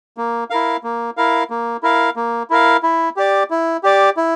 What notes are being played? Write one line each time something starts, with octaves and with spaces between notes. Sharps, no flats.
A#3
E4 A#4 F5
A#3
E4 A#4 F5
A#3
E4 A#4 F5
A#3
E4 A#4 F5
E4
G4 D5
E4
G4 D5
E4